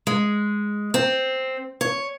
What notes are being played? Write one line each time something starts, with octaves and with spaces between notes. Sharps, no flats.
G#3
C4
C#5